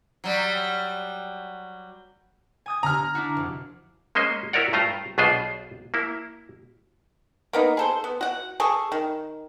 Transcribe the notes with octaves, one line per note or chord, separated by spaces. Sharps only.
F#3 G3
G#5 D#6 G#6
D3 A#5 F6
D4 E4 F#4
F1
G#3 A#3 C#4 C5 D#5
E4 F#4 A#4 C#5 D5 F#5
G2 A3 F4 C5 A#5
B1 B2 D4 F4 G#4 C5
A#3 E4
A#3 B3 D#4
G#4 A4 C5
B3
F#4 F#5
G#4 A4 C#6
D#3